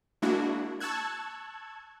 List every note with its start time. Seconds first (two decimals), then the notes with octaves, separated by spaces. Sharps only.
0.22 G#3 A#3 D4 E4 F#4
0.80 A5 C#6 E6 F#6 G#6